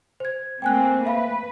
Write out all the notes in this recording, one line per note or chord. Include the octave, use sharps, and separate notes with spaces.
C5 G#6
A3 A#3 C4 G5 G#5 F#6
B4 E5 F5 B5